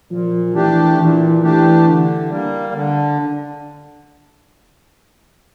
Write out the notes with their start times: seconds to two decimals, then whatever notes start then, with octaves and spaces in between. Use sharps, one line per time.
0.11 A#2 F3
0.55 E3 A3 D4 G4
0.99 A#2 E3
1.43 E3 A3 D4 G4
1.86 D3
2.30 G3 A#3
2.74 D3